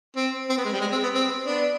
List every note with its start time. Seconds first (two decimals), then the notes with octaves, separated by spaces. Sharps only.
0.16 C4
0.50 C4
0.58 B3
0.65 G#3
0.73 G3
0.81 G#3
0.92 C4
1.03 B3
1.14 C4
1.46 B3 D4